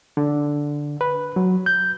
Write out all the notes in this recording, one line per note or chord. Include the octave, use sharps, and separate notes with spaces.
D3
B4
F#3
G6